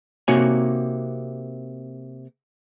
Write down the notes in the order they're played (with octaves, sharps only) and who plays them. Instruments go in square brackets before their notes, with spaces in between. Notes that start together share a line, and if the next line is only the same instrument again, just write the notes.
[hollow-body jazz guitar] C3 A#3 D#4 F#4 C#5 G#5